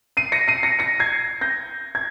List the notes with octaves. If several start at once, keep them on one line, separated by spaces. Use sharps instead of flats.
C7 D#7
A#6 C#7
C7 D#7
A#6 C#7
A#6 C#7
G#6 C7
G6 A#6
G#6